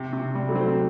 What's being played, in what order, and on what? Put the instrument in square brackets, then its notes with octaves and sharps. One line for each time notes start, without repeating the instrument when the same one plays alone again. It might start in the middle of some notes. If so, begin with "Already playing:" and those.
Already playing: [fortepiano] C3
C3
G3
[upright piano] F#3 A3
[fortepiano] C4